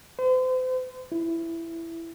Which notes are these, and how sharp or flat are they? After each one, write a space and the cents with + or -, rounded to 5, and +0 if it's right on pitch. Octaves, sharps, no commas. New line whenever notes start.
C5 -40
E4 +10